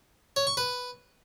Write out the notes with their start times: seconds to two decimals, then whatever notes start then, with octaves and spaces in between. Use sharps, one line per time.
0.36 C#5
0.47 C#6
0.57 B4